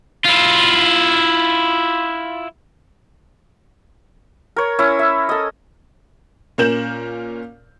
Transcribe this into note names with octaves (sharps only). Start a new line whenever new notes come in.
E4 F4
A#4 C#5
C#4 E4
E5
A4 D#5
A#2 C#4 A#4 G6 E7 F#7